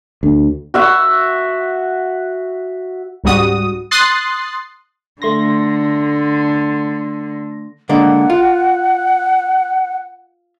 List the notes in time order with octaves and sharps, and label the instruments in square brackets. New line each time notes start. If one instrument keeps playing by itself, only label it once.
[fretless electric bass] D2
[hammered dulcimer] F#4 E5 F#5
[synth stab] C#2 G#2 G3 F#4 D#6
C6 D#6 F#6 A6 C7
[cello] D3 [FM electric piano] A3 C6 A#6
[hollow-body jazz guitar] D3 G#3 A#3 [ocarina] F#5
[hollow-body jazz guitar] F4